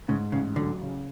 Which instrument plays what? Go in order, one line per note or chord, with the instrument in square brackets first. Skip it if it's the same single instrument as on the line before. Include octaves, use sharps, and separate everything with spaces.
[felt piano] G#2 [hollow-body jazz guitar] C#3
[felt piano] A1 [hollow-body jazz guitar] C#3
[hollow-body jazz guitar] D3 [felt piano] F#3
[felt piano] C#3